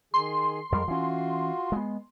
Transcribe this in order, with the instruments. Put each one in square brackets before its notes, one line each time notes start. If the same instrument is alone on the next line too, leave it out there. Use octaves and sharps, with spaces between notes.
[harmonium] D#3 G#4 [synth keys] C6
[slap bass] F2 G3 [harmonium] G#3 A#4
[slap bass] E3 C#4 [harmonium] F4 F#4
[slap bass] G#3 B3